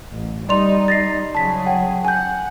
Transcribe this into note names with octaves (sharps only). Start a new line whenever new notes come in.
A1
G3 D#4 D5 C6 F7
A6 A#6 C7
C#3 F#3 G#4 A5 B6
F#5 G5
F#5 G#5 G6